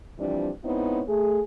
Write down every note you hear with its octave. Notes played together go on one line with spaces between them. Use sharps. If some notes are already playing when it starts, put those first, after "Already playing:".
E3 F3 G3 C4 D4
G#2 B3 C4 D#4 E4 C#5
A3 G#4